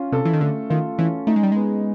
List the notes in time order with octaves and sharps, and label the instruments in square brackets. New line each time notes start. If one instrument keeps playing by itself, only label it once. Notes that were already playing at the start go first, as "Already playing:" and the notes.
Already playing: [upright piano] C#4 F4
[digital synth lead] C3 [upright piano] A4
[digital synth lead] E3
D#3
[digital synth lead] D3 [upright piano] A3
[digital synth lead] D#3 [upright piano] F4
[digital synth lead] E3 [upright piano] C#4
[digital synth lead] A3 [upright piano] D#4
[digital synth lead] G#3
G3
[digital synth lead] G#3 [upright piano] B3